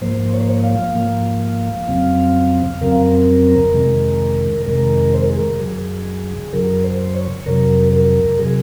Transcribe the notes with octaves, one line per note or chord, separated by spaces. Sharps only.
G#2 F3 A#3 C5
C#5
C5
C#5
F5
G#2 F3 A#3
F2 C#3 F#3 C4
F2 C#3 F#3 C4 A#4
F2 C3 D#3 G#3
F2 C3 D#3 G#3 A#4
C5
A#4
G#4
A#4
F#2 C#3 F#3 G#4
F#2 C#3 F#3 A#4
C5
C#5
F2 C3 F#3 A#4
A#4
C3 F#3 G#4